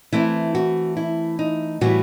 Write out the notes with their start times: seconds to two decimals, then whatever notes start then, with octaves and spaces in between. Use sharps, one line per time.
0.12 E3 A3 C4 E4
0.55 F#4
0.97 E4
1.39 D#4
1.81 A2 E3 G3 F#4